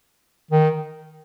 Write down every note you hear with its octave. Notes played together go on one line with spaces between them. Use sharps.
D#3